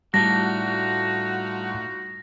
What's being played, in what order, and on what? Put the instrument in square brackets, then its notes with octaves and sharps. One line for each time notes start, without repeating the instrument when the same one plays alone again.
[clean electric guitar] A2 A3 D4 [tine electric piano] G3 [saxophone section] D#4 F4 F#4 [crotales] A#6